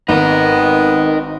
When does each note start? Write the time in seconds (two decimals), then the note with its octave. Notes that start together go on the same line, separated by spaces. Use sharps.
0.09 G#1 B3 D#4 A#4